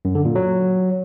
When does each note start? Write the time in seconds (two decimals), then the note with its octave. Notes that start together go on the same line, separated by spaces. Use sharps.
0.05 F#2
0.15 D3
0.25 A#2
0.35 F#3